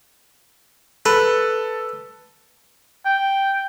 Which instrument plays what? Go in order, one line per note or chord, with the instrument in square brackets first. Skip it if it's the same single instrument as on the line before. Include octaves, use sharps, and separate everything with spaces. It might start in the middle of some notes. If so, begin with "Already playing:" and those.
[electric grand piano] A4 [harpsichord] B4
[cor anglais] G5